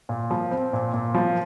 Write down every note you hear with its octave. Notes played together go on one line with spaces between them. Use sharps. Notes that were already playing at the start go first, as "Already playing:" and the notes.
A#2
F3
C4
A#2
A#2
F3